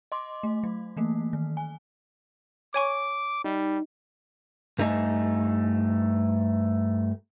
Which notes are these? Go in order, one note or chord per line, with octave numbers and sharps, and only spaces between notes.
D#5 C6 D6
A3
F#3
E3 A3 A#3
D#3
G#5
C#5 G#5 C#6 D6
G3 D#4
G2 A3 D#4 D#5 G#5